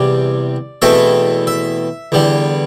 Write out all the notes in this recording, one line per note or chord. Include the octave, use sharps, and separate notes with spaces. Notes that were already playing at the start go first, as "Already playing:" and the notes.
Already playing: E2 C3 G3 C4 D5
E2 B2 A3 C4 E5
E5
E2 D3 G3